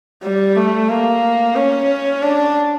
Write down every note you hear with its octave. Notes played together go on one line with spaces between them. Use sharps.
G3
A3
A#3
C#4
D4